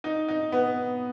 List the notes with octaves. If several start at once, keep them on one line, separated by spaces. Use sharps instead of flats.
D#4
D#4
B3